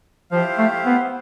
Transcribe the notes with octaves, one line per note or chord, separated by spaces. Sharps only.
F3 E4 G4 C5 F5
A3
B3